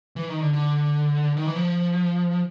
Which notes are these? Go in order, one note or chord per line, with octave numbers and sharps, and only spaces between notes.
E3
D#3
D3
D3
D#3
E3
F3